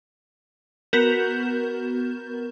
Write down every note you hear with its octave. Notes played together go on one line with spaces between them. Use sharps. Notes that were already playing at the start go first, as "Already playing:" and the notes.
B3 F#4 A#4 G6 E7